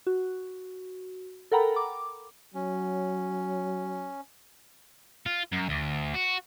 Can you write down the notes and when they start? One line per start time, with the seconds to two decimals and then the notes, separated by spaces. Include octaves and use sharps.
0.07 F#4
1.52 A4 A#4 F#5 G5 A#5 B5
1.76 D6
2.55 F#3 C#4
5.26 F4
5.52 F#2
5.69 D2
6.15 F#4